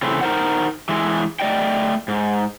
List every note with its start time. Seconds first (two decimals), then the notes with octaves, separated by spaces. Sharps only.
0.02 C#3 E3 A3 C4
0.21 D#4 A#4 C5 F#5
0.89 E3 G#3
1.40 A3 D5 D#5 G5
2.08 G#2